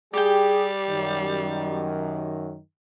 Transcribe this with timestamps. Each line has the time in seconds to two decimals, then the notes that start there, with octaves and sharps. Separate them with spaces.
0.13 G3 G4 G#4 G5
0.89 F#2 D#3